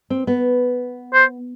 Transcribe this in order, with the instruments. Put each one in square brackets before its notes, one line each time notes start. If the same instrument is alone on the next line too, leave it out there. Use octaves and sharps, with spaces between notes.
[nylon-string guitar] C4
B3
[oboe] C5